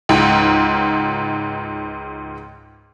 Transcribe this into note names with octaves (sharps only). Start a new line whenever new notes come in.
C#2 G#2